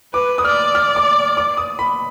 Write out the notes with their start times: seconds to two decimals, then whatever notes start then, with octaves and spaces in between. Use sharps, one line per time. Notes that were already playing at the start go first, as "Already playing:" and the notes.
0.13 B4 D6
0.38 D#6
0.44 D5 F6
0.75 F6
0.96 D6
1.37 D6
1.57 D#6
1.79 B5